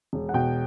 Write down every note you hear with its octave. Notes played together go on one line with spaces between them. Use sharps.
E1
F#5
B2 G5